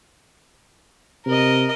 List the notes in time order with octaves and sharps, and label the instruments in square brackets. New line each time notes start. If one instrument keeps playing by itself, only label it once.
[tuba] C3 [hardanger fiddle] A#4 D#5